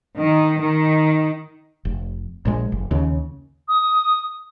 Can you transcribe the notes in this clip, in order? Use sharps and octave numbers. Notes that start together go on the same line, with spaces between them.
D#3
D#3
F1
A#1 A#2 G#3
F#1
D#2 C#3
D#6